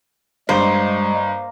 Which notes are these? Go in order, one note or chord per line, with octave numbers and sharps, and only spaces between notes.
G2 G3 G#3 A#3 C5 D#5